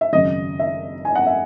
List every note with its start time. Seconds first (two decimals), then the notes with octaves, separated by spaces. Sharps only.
0.01 E5
0.13 G#1 F#2 C#3 D#5
0.59 E5
1.05 G#5
1.15 F#5
1.26 E5